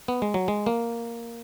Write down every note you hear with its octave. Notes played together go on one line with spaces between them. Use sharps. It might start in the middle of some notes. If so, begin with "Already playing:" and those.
B3
G#3
F#3
G#3
A#3